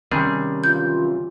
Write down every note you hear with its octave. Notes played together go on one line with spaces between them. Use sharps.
C3 D#3 G3 C#4 G#4
E3 F#3 F4 G6